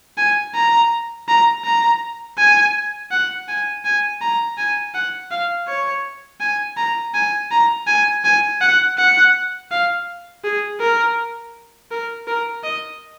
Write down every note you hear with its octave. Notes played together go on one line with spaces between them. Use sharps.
G#5
A#5
A#5
A#5
G#5
F#5
G#5
G#5
A#5
G#5
F#5
F5
C#5
G#5
A#5
G#5
A#5
G#5
G#5
F#5
F#5
F5
G#4
A#4
A#4
A#4
D#5